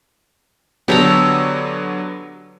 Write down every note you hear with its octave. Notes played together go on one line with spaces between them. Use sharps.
D3 F#3 B3 G4 A4 A#5